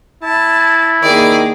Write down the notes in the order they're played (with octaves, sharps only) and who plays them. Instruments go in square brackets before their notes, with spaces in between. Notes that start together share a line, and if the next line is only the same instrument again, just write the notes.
[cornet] E4 [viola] A5
[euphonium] D#3 [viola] A#3 G#4 [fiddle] D5